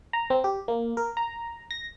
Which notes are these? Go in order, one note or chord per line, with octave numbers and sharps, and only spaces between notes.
A#5
C4
G4
A#3
A#4
A#5
A#6